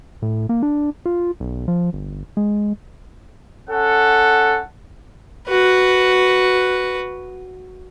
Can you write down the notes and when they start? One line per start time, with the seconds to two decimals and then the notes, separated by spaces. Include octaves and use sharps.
0.22 A2
0.49 A#3
0.63 D4
1.06 F4
1.40 B1
1.68 F3
1.93 G1
2.37 G#3
3.69 C#4 A4 F#5
5.48 F#4 B4